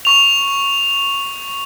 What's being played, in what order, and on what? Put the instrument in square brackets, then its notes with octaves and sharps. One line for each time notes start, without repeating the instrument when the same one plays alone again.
[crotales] C#6 F7